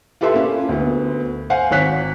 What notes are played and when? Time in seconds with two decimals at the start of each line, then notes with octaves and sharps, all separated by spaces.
0.21 F4 G4 A4 B4 E5 C6
0.34 A#3 C#4
0.69 D2 B3
1.50 C5 F5 F#5 G#5
1.71 G#1 C#5 F#6 B6